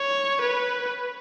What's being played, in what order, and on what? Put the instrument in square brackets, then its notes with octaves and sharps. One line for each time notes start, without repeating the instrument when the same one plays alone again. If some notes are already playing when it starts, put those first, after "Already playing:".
Already playing: [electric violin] C#5
B4